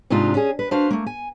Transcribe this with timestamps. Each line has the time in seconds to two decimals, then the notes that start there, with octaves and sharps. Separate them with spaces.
0.10 G#2 C3 D4 D#4 F4
0.35 C#4 G#4
0.59 B4
0.71 D4 F#4 B4 C5 F5
0.90 A3 A#3
1.06 G#5